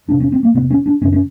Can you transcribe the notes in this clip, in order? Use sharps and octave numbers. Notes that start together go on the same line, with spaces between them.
E2 C3 D4
C#4
C4
A#3
E2 C3 B3
C#4
D4
F#2 C#3 C#4
C#4